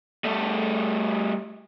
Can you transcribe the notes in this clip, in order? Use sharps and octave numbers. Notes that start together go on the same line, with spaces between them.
G3 A3